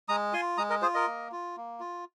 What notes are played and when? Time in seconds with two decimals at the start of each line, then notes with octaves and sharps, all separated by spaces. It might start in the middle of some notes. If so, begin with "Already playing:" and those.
0.09 G#3 A#5 D#6
0.33 F4 G#5 C6
0.58 G#3 A#5 D#6
0.70 A#4 D#5
0.82 F4 G#4 C5
0.94 A#4 D#5
1.07 A#3
1.32 F4
1.57 A#3
1.80 F4